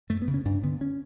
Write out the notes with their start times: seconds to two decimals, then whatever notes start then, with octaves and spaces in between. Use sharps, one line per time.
0.10 F#2 A3
0.22 B3
0.28 C#3
0.34 C#4
0.45 G2 D4
0.63 D3 B3
0.81 C#4